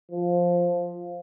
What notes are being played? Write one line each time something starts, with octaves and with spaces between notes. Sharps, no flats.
F3